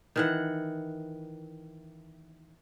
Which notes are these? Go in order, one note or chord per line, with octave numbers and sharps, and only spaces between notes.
D#3 E3 F#5